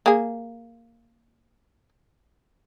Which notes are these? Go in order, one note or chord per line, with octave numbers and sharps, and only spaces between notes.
A#3 G#4